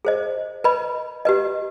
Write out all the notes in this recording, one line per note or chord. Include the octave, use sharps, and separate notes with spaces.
G#4 C5 D#5
B4 D#5 B5
G4 B4 D#5